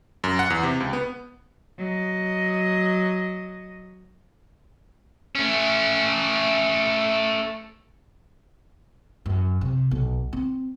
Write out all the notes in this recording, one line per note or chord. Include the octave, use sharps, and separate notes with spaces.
F#2
F#5
E2
C3
C#2
B3
F#3 D#5
A3 C#4
F#2
C3
B1
C4